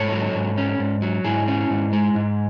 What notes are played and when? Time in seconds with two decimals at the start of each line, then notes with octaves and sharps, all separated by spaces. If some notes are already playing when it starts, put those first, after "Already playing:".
Already playing: G#2 A4 C#5
0.12 F#3
0.35 G#2
0.58 C#4
0.79 G#2
1.02 F#3
1.24 G#2 E4 G#4
1.48 C#4
1.70 G#2
1.93 G#3
2.15 G#2